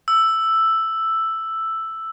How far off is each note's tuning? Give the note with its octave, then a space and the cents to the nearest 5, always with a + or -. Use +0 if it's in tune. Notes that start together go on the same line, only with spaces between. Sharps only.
E6 +5